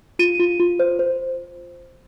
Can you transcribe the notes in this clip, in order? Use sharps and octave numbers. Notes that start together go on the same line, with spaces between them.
F4 D#7
F4
F4
C5
C5